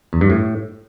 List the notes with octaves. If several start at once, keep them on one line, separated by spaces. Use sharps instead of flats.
E2
G2
A2